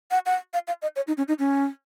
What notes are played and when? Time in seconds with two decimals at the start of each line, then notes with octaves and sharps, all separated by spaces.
0.11 F#5
0.26 F#5
0.53 F5
0.67 F5
0.82 D#5
0.96 C#5
1.07 D#4
1.17 C#4
1.28 D#4
1.39 C#4